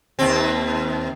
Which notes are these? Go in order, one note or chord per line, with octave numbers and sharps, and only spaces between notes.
D#2 C4